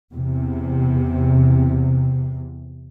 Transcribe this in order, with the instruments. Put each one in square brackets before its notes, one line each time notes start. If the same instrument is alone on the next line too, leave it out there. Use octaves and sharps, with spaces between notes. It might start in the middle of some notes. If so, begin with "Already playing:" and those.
[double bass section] E2 C3